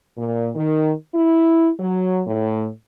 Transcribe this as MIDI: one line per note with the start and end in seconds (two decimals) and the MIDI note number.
0.18 0.50 46
0.55 0.92 51
1.15 1.69 64
1.79 2.22 54
2.27 2.68 45